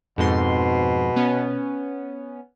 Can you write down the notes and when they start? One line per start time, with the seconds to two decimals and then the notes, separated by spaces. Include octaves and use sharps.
0.18 F2 G#2 B2 C6
1.16 B3 C#4